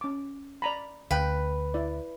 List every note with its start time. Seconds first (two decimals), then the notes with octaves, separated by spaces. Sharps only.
0.01 C#4 D6
0.62 D5 A#5 B5
1.11 D2 B4 F5 G5
1.74 E4 D5